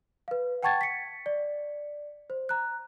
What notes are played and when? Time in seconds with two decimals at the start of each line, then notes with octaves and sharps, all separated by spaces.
0.28 B4 F5
0.63 F#5 G5 A5 C#6 G#6 A6
0.81 B6 C#7
1.26 D5
2.30 C5
2.49 A#5 F#6